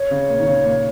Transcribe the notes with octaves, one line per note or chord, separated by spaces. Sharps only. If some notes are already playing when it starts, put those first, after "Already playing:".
Already playing: C#5
C#3
A#2
D#3
C#3
A#2